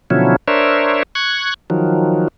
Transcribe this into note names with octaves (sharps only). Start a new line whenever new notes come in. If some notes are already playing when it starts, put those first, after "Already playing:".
B2 D3 F3 F#3 C#4 E4
D4 A#4 C5 C#5 E5
C#6 F#6 G#6
D#3 F3 F#3